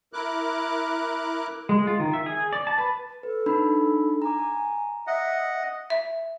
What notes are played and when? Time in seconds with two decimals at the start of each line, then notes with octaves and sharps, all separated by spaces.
0.13 E4 A#4 D6 F#6
1.69 G#3
1.87 F4
2.00 D#3
2.14 E5
2.26 G#4
2.53 D5
2.67 A5
2.78 B4
3.23 A4 B4
3.46 D4 D#4 B5
4.22 G#5 A#5 D6
5.07 D#5 E5 F#5
5.90 E5